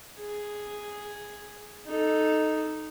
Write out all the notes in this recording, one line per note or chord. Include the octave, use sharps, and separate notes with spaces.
G#4
D#4 A4